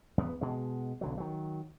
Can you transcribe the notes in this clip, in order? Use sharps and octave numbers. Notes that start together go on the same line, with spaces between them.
E2 B3
B2 G#3
B1 D3 F#3
D#3 F#3